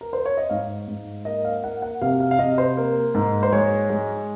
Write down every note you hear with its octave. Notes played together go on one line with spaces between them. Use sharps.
A#4
C5
C#5
D#5
G#2 F5
G#2
A#3 D#5
F5
A#3 F#5
F#5
C3 F5
F5
F5
C3 D#5
C5
A#3
G#2
C5
G#3 C#5
G#3